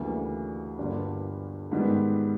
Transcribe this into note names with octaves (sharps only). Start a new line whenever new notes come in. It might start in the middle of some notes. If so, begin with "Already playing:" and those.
Already playing: D2 C#3 E3 G3 A#3
G1 G2 D3 G3 A#3
G#2 D#3 G3 B3